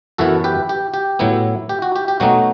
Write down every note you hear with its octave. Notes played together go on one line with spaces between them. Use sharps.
F#2 E3 B3 E4 F#4 A4
G4 B4
G4
G4
A2 F#3 B3 E4
G4
F#4
G4
G4
B2 F#3 A3 D#4 F#4